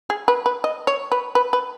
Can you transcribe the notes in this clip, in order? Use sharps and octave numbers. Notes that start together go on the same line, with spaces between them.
G#4
B4
B4
D#5
C#5
B4
B4
B4